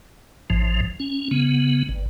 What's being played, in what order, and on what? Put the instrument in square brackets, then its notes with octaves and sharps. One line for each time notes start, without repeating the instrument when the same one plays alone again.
[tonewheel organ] A1 G#2 F3
C#4
C#3 B3
G1